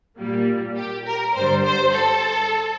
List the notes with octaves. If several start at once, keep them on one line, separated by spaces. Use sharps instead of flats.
A#2 G3 A#3
G4
A#4
G2 D3 G3 C5
C5
A4